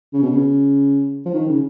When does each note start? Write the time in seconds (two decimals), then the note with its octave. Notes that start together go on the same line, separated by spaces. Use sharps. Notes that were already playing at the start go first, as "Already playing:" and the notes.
0.13 C#3
0.22 B2
0.32 C#3
1.25 F3
1.34 D#3
1.49 C#3